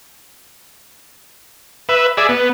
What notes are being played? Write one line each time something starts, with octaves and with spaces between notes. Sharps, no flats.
B4 E5
G#4 D5 E5
B3